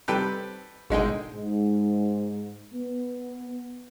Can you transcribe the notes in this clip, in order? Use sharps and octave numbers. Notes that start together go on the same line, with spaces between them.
G3 C4 D#4 G4 A4 B4
G#1 B2 D3 G#3 D#4 G5
G#2
B3